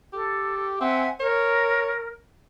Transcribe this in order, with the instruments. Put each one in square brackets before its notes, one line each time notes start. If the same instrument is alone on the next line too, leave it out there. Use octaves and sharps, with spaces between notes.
[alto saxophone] G4 [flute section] A4
[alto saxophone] C4 [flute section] E5 F#5 G#5
[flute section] A#4 [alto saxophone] C#5